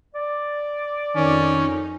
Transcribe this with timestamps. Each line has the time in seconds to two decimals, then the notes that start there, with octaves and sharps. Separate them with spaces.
0.14 D5
1.16 F2 D#3 C#4 D#4